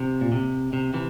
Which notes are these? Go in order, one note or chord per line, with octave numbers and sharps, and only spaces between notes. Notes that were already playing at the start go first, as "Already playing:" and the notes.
Already playing: C3
A#2
C3
C3
C3 E3